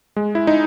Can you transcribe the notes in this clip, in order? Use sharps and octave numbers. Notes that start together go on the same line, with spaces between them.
G#3
E4
D#4